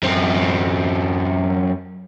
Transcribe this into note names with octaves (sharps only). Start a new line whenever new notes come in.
F#2 C4